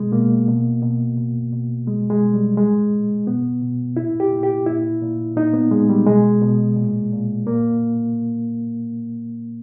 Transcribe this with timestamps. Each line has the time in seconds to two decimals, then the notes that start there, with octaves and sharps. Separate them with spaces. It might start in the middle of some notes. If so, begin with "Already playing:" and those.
Already playing: B2 G#3
0.12 B2 A#3
0.47 B2
0.82 B2
1.17 B2
1.52 B2
1.87 B2 G#3
2.10 G#3
2.22 B2
2.34 G3
2.57 A#2 G#3
2.92 A#2
3.27 B2 B3
3.62 B2
3.97 A#2 E4
4.20 G4
4.32 A#2
4.43 G4
4.66 A#2 E4
5.02 A#2
5.36 A#2 D#4
5.54 B3
5.71 A#2 G#3
5.89 G3
6.06 B2 G#3
6.41 B2
6.76 A#2
7.12 A#2
7.47 A#2 A#3